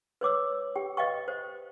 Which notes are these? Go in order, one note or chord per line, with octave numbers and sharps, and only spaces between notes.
B4 C#5 D6 E6
G4 G5
B4 D#5 F5 G5 C#6
C5